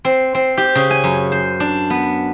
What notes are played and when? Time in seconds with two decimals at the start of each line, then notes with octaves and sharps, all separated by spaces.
0.05 C4
0.35 C4
0.57 G4
0.75 C#3
0.91 G#5
1.04 F#2
1.32 C5
1.60 D4
1.90 B3